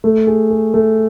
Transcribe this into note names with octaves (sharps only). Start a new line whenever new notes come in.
A3
G#4
G#4
A3